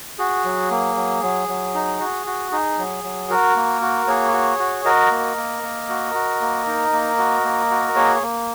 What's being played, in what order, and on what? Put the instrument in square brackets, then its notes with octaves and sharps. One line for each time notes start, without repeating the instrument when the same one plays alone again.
[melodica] F#4 G#4
F#3
A#3
F#3
F#3
F#3
D#4
F#4
F#4
D#4 G#4
F#3
F#3
F#4 A#4
A#3
F#4
A#3 G#4 C#5
F#4
F#4
F#4 A#4 D#5
A#3
A#3
A#3
F#4
F#4
A#3
D#4
A#3
F#4
A#3
F#4
A#3 G#4 C#5
A#3